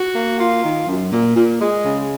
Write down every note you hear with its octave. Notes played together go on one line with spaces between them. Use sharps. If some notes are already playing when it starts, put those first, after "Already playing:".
Already playing: F#4
A#3
F4
D#3
F#2
A#2
A#2
G#3
C#3